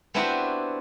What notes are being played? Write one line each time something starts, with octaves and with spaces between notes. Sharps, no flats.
B3 C4 D4 E4 F#4 G4